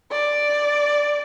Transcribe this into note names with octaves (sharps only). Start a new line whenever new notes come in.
D5